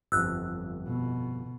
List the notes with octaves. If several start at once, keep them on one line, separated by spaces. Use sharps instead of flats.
G1 F2 E6 F#6
B2